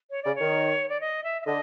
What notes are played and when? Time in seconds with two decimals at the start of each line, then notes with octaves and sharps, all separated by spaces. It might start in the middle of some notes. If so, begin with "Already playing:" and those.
0.11 C#5
0.23 C#3 D5
0.35 C#5
0.41 D#3
0.89 D5
1.00 D#5
1.24 E5
1.42 E5
1.46 D3 D#5